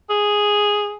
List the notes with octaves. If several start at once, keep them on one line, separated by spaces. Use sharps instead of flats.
G#4